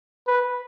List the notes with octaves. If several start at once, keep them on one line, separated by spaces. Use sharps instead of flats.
B4